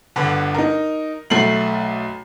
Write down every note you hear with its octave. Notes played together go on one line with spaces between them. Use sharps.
G1 D3 B4
D#4 A#4
B1 A3 C7 F#7